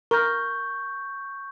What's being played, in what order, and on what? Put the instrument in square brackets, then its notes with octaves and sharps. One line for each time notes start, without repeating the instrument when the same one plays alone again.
[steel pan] A#4 [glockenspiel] C#6 G6